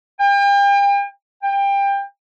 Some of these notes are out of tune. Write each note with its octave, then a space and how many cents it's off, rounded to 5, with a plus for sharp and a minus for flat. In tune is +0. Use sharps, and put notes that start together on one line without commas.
G5 +40
G5 +25